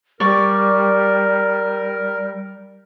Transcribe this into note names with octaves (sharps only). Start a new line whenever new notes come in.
G3 A#4 D5 C#6